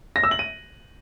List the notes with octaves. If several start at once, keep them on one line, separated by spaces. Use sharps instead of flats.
A#6
E6
F#7
D#7